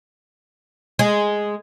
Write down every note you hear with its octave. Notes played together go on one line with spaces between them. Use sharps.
G#3